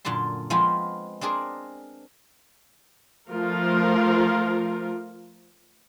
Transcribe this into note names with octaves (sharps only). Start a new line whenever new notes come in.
F#2 A#2 D3 A5 C6
F3 G#3 B3 C4 F4
C4 D4 G#4 A#4 D5
F3 A3 F4 A#4